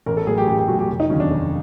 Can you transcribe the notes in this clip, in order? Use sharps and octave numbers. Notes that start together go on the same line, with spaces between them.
A1 A#4
A4
A2 F#3 G#4
G4
A1 G4
G4
A2 F#3 F#4
G4
F1
D#4
D#2 D3 F#3 C#4
D4
F1